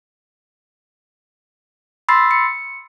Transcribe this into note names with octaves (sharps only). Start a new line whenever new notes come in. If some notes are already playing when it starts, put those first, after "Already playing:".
B5 C6 E6 A6 C7
C#7